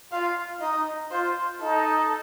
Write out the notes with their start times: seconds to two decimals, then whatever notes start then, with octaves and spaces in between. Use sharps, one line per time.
0.12 F4 F5
0.61 D#4 D#5
1.12 F4 C5
1.61 D#4 A4